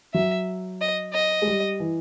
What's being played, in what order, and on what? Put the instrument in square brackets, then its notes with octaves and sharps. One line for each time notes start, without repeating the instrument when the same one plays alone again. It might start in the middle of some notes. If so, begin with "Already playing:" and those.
[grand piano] F#3 [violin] E5
[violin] D#5
D#5
[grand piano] G#3
G3
E3